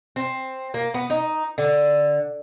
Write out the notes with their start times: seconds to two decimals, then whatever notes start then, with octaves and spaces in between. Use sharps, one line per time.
0.16 C4
0.74 A#3
0.94 B3
1.10 D#4
1.58 D3